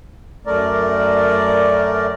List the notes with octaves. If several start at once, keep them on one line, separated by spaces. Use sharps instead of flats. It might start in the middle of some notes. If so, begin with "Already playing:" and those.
F#2 A3 A#4 D5